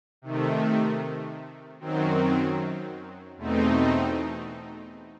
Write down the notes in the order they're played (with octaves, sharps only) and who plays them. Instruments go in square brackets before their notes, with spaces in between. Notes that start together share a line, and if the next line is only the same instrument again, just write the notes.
[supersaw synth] C3 D#3 A3
F#2 D#3 F#3 C4
E2 B2 A3 C4 D#4